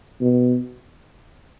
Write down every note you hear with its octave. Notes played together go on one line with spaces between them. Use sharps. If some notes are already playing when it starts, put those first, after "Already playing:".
B2